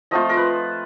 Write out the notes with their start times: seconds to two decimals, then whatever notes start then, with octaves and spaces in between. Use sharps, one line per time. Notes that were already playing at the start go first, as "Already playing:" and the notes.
0.11 F3 A3 C4 F4 D#5
0.29 A#4
0.37 B4